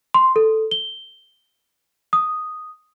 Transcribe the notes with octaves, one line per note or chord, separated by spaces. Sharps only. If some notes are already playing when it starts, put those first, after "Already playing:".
C6
A4
G7
D#6